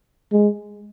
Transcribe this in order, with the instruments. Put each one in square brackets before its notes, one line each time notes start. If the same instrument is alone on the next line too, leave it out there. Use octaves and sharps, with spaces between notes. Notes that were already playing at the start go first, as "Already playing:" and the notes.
[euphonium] G#3